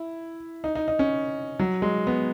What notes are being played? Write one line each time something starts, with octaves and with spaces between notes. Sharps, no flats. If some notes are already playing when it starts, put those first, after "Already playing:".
Already playing: E4
D#4
D#4
D#4
C#4
F#3
G#3
B3